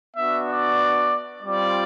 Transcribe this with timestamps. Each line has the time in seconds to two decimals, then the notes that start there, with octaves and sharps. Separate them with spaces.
0.16 B3 D4 F#4 E5
0.48 D5
1.43 G3 C4 F4 D5